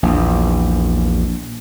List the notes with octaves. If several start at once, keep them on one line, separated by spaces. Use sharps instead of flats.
A#1 E2